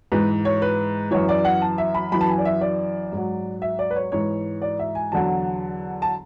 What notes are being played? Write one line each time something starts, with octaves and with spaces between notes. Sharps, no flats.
G#2 E3 B4
C#5
B4
F#2 E3 C#5
D5
F#5
A5
E5
B5
F#2 E3 B5
A5
G#5
D5
E5
D5
G#2 F#3
E5
D5
B4
C#5
G#2 E3 C#5
D5
E5
G#5
E2 D3 F#3 A5
A5